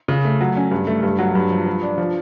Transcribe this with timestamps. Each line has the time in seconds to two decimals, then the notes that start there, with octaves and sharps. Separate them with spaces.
0.08 C#3
0.25 A3
0.41 F#3
0.57 C#4
0.71 G2
0.87 A3
1.03 G2
1.19 F#3
1.35 G2
1.51 F3
1.66 F3
1.82 D4
1.98 F3